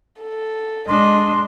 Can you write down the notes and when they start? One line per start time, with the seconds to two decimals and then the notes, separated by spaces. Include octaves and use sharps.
0.20 A4
0.88 G#3 D4 D#5 C6